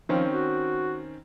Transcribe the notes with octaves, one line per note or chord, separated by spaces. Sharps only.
D#3 F3 C4 C#4
F#4